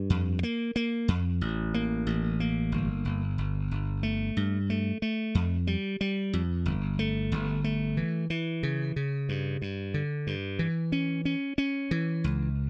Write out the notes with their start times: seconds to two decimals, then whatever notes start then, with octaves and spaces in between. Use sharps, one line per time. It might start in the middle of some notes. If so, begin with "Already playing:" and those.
Already playing: G2
0.10 F2
0.43 A#3
0.76 A#3
1.08 F2
1.41 A1
1.74 A#3
2.07 A1
2.40 A#3
2.72 G1
3.05 G1
3.38 G1
3.71 G1
4.03 A3
4.37 G2
4.70 A3
5.02 A3
5.35 F2
5.67 G3
6.01 G3
6.33 F2
6.66 G1
6.99 A3
7.32 G1
7.64 A3
7.97 E3
8.30 E3
8.63 C#3
8.96 C#3
9.29 G2
9.62 G2
9.94 D3
10.27 G2
10.59 E3
10.92 C#4
11.25 C#4
11.58 C#4
11.91 E3
12.24 C#2